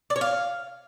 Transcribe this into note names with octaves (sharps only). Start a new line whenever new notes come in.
D5
C#5
F5